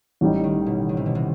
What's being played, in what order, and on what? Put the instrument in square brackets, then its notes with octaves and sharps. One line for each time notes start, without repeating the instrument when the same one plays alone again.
[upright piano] A1 A2 G3 D#4
[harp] D#3
B2
D#3
C3
B2
C3